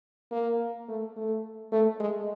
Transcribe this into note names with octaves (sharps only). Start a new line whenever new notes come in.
A#3
A3
A3
A3
G#3